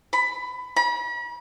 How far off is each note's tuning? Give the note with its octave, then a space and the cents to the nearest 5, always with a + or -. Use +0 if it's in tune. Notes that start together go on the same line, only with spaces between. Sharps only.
B5 +20
B5 -40